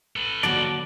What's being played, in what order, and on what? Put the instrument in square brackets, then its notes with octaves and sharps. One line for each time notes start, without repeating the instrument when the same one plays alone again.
[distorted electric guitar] A4 B4
[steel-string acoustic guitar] D#2 D3 F#3 [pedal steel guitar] D5 A5 [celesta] D7